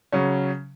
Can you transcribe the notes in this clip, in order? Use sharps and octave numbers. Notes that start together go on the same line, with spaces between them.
C#3 F#3 C#4